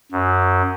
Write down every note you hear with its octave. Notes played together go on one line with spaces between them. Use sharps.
F#2